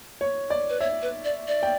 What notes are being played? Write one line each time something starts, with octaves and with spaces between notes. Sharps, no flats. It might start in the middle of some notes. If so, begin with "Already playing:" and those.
C#5
D5
B4
C#5 E5
B4
D5
D5
G5